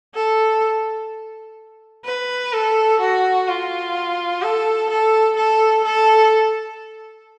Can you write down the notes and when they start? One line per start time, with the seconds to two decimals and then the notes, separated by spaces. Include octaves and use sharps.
0.15 A4
2.05 B4
2.53 A4
3.00 F#4
3.48 F4
4.43 A4
4.90 A4
5.37 A4
5.85 A4